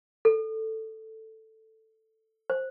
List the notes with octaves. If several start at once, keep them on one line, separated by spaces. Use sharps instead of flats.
A4
C5